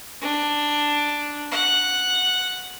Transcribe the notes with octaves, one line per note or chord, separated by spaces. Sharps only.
D4
F#5